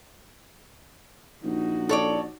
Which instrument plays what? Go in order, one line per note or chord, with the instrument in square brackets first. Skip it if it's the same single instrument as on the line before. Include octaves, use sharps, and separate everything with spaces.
[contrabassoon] A#1 [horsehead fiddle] D#4 F#4
[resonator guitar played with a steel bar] A4 C#5 D5